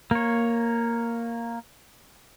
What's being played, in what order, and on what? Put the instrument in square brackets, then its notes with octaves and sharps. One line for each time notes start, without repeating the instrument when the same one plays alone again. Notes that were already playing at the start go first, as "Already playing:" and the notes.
[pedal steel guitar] A#3 C#5